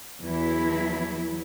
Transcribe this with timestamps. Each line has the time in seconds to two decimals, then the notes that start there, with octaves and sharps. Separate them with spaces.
0.21 E2 E3 F#3 E4